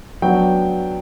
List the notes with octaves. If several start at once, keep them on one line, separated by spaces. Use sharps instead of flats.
F#3 B3 D4 G5